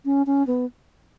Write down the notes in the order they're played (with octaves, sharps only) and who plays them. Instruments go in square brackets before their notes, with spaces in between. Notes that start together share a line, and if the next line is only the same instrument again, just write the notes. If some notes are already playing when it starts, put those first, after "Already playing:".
[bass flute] C#4
C#4
B3